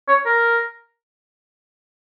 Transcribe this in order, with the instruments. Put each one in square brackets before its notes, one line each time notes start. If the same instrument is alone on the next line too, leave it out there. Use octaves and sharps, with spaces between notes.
[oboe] C#5
A#4